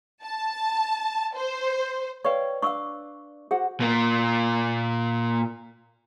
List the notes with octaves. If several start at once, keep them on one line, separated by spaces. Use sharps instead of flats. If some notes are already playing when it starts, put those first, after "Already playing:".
A5
C5
B4 C#5 D5 F5 G5 C#6
D4 F5 C#6 D6 E6
F#4 G#4 C5 F#5
A#2 A#3